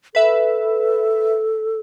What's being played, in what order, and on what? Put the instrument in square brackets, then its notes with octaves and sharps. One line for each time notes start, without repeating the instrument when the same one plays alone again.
[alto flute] A4 [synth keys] B4 E5